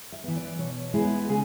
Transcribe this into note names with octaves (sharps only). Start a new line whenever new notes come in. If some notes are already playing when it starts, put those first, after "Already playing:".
E5
E3 B3
D5
B2 C#5
G#3 B3 E4
C#3 G#4